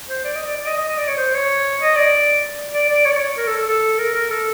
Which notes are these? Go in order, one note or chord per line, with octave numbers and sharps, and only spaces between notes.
C5
D5
D#5
D5
D5
D#5
D#5
D#5
D5
C#5
C5
C#5
D#5
D5
D5
D5
C#5
D5
C#5
A#4
A4
A4
A4
A#4
A#4
A4